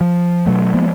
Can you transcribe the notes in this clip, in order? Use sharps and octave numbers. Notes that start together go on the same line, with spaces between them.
F3
B2 F#3 A3
F3 G#3 A#3 B3